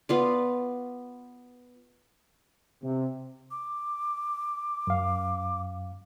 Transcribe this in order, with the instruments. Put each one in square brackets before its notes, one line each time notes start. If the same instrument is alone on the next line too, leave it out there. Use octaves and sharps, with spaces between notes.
[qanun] B3 F4 D5
[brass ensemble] C3
[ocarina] D6
[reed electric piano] F#2 F5